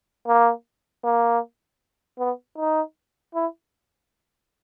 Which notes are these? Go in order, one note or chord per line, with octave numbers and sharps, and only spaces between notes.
A#3
A#3
B3
D#4
E4